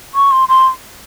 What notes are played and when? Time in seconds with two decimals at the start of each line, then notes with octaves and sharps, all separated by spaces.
0.15 C#6
0.31 C6
0.49 C6